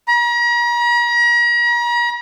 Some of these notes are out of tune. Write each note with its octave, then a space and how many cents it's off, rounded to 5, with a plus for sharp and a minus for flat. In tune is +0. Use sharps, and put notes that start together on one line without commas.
A#5 +40